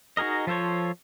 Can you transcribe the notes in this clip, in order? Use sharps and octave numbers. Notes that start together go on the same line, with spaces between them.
D#4 F#4 G#4 A#4 D#5
F3 F4 A4 C5 C#5